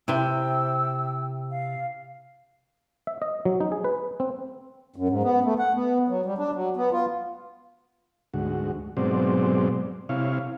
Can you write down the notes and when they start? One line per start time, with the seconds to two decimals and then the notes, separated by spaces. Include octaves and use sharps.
0.08 C3 E4 C5 G5 E6
1.50 F5
3.07 E5
3.22 D#5
3.45 F#3
3.61 D#4
3.72 G#4
3.84 B4
4.20 C4
4.96 F#2
5.09 G#2
5.23 B3
5.44 A3
5.59 F#5
5.75 B3
6.09 F#3
6.26 G3
6.38 D4
6.54 F#3
6.76 B3
6.92 F4
8.34 D2 G#2 F#4
8.97 G#2 B2 F#3 C4 C5 D5
10.09 C3 E4 C#5 F5